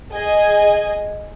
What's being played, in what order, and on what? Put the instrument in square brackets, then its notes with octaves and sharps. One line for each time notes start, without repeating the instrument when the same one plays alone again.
[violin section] G#4 D#5 G#5